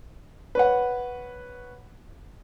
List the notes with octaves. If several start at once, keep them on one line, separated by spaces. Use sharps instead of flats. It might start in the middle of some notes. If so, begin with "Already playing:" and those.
B4 C#5 F#5